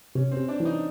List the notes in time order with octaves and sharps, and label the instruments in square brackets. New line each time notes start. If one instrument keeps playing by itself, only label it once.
[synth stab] C3 [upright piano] C#4
[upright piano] C4
[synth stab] C3
[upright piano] D4
[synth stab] E3
[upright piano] D#4